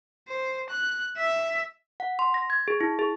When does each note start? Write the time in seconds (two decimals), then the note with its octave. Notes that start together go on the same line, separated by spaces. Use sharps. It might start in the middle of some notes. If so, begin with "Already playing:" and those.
0.28 C5
0.70 F#6
1.17 E5
2.00 F#5
2.19 C6
2.34 A#6
2.50 G#6
2.68 G#4
2.81 E4
2.99 G#4